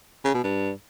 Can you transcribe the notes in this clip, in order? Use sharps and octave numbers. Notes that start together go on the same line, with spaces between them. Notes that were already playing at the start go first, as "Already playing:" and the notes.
C#3
B2
G2